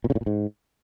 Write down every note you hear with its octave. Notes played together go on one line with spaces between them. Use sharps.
A#2
C#3
A2
A#2
G#2